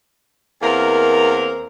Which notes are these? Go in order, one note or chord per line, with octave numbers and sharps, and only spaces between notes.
E2 A#3 C4 A#4